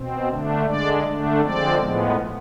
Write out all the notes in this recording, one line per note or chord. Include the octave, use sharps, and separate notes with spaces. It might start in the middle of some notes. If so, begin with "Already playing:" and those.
Already playing: B2 C4
D3 A3 D4
D3 G#3 D4 D5
D3 A3 D4
D3 F3 G#3 C4 D5
A2 F3 G#3 B3